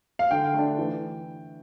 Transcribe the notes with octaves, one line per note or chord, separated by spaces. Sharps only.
F5
D3 G5
A3 D4
E3